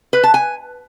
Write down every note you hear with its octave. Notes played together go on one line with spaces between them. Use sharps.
B4
A5
G#5